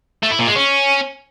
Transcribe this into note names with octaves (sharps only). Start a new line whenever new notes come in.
A3
E4
A#2
G#3
C#4